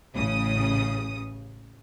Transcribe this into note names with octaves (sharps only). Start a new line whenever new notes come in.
A1 C#3 D#6